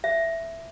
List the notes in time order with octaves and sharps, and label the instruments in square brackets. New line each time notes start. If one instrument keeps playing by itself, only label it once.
[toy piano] E5